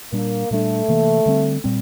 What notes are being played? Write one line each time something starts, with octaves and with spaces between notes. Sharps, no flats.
A#2 G3 A#3 D4
A#2 G3 A3 D4
C3 E3 A#3
D3 G3 C4
A#2 G3 C4